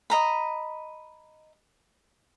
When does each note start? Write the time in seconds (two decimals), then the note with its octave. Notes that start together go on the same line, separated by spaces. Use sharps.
0.10 D#5 A#5 B5